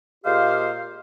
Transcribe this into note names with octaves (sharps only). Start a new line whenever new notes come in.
A#2 G#3 G4 G#4 C5 F5